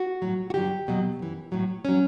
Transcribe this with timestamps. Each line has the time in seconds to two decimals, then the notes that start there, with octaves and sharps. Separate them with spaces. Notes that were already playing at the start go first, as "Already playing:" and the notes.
Already playing: F#4
0.22 A2 F#3
0.50 F#4
0.54 G2 D3 F#3 G4
0.87 E2 B2 F#3
1.19 F#2 E3
1.52 A2 F#3
1.85 F#3 C#4